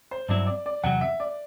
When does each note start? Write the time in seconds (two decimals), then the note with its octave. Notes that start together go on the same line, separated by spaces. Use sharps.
0.11 C5
0.29 G2 F#3 C4 E4 D5
0.47 D5
0.66 D5
0.84 E2 C3 F#3 F#5
1.01 E5
1.20 D5